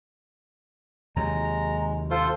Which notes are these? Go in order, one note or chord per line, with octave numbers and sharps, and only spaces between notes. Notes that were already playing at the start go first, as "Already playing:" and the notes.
D#2 C3 F#3 G#3 A#5
F4 A4 C5 C6